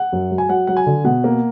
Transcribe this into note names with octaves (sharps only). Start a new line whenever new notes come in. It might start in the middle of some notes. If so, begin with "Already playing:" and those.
Already playing: F#5
F#2
F#3
G#5
F#3 F#5
F#3 F#5
G#5
D3
B2 F#5
A#3